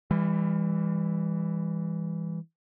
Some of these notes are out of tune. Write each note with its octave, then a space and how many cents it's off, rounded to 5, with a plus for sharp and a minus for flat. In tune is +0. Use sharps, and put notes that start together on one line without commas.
E3 +0 G3 +40